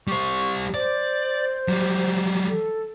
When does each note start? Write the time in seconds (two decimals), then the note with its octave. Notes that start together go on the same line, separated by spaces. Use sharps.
0.08 G3 C5 C#6
0.74 C5 D5
1.68 F#3 G3
2.48 A4